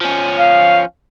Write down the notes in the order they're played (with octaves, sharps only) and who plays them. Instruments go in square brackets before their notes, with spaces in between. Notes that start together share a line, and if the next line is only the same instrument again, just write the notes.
[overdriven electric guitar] F3 C#4
[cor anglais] F5